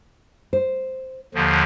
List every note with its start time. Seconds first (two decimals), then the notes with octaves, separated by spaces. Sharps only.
0.53 C5
1.35 D#2 D3 F3